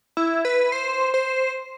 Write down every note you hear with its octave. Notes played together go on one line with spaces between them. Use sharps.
E4
B4
C5
C5